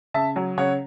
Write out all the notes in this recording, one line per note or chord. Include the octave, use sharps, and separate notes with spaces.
C#3 E5 A5
F#3
C#3 C#5 F#5